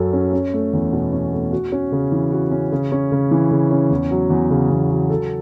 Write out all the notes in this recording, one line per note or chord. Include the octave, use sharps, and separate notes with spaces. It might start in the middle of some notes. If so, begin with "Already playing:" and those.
Already playing: F#2 F#3 C#4 A4
C#4
C#4
A3
E2
B2
C#4
A3
F#4
C#4
C#3
E3
F#4
C#4
C#3
C#4
C#3
E3
C#3
C#4
E2
F#3
E2
C#3
E2
F#3
A4